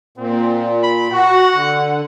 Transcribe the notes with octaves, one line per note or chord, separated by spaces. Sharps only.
A#2 C4
B5
F#4 F#5
D3